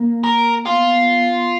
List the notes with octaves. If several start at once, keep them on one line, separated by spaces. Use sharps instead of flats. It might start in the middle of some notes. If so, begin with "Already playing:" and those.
Already playing: A#3
A#4
B3 F4